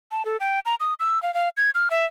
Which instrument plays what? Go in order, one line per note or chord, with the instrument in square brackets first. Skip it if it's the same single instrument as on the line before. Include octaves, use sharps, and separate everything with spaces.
[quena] A5
A4
G5
A#5
D#6
E6
F5
F5
G#6
F6
E5